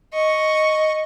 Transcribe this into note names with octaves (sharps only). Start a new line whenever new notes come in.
D#5 C#6